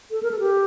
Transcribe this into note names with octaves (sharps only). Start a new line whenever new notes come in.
A4
A#4
A4
G4